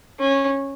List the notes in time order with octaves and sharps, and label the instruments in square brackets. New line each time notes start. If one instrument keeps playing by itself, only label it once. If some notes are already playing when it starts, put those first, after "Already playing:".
[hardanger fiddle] C#4